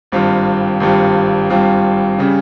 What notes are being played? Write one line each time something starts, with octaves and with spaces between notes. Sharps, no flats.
G#1 G2 G3 C4 F4
G#1 G2 G3 C4 F4
G#1 G2 G3 C4 F4
C#3 G3 C#4